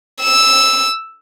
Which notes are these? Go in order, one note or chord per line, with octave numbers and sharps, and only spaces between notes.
E6